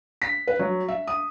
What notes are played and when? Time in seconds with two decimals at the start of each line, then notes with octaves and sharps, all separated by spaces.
0.22 B6
0.47 B4
0.59 F#3
0.88 E5
1.07 D#6